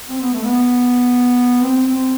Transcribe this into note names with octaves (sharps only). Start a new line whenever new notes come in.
C4
B3
A3
B3
C4
C4